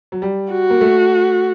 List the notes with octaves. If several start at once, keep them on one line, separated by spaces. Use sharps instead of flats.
F#3
G3
F#4
A#3
A3